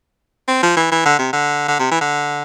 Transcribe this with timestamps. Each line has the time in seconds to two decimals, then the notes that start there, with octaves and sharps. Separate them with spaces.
0.48 C4
0.63 F3
0.77 E3
0.92 E3
1.05 D3
1.19 C3
1.33 D3
1.68 D3
1.79 C3
1.91 E3
2.01 D3